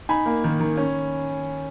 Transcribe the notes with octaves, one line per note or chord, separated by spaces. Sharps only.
D#4 G#5 B5
A#3
D#3
D#3
C#4